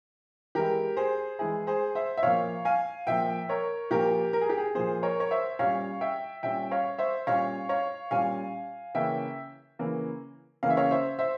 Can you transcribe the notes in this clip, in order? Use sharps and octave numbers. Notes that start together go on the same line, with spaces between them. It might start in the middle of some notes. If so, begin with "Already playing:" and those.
E3 G#3 E4 G4 A#4
G#4 C5
E3 G#3 E4 G#4
G#4 C5
C5 E5
E5
A#2 F3 A#3 C#5 F5
F5 G#5
A#2 F3 A#3 E5 G5
A#4 C#5
A#2 F3 A#3 G4 A#4
A#4
G#4
G4
G#4
A#2 F3 A#3 G#4 C5
A#4 C#5
C#5
C5 E5
A#2 G3 C#4 C#5 F5
E5 G5
A#2 G3 C#4 E5 G5
C#5 F5
C5 E5
A#2 G3 C#4 C#5 F5
C#5 F5
A#2 G3 C#4 F5 G#5
C#3 E3 A#3 C#4 E5 G5
C#3 E3 A#3 C#4
C#3 E3 A#3 C#4 F5
E5
C#5 F5
C5 E5
C5 E5